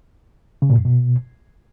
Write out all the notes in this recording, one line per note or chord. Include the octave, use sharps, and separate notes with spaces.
C#3
A#2
F#2
B2